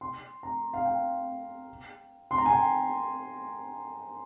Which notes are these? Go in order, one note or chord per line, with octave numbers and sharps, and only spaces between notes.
C6
A#5
F5
G5
C6
A#5
G#5
G5